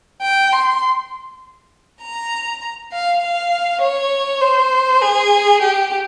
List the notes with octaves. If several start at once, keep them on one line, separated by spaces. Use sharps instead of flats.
G5
C6
A#5
F5
F5
C#5
C5
G#4
G4